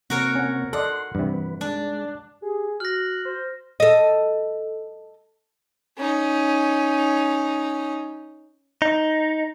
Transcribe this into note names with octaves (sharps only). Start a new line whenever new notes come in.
C3 A#3 C4 F#4 A#4 C#5
C#4 F#5
A4 D5 D#5 F#5 C6
G2 C3 E3 B4
G#3 D4
G4 G#4
F#4 F6 F#6 A#6
C5
A4 D#5
C#4 D#4
D#4